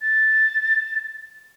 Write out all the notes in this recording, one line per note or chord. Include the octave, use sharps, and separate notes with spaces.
A6